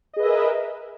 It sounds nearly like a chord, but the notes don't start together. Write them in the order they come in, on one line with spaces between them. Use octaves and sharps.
D#5 G#4 B4 E5 A#4